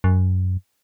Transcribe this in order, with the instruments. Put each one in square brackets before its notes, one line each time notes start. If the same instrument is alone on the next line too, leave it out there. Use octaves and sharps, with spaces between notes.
[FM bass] F#2